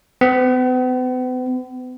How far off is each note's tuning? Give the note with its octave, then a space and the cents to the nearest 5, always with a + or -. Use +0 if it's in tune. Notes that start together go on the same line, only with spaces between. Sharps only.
B3 +45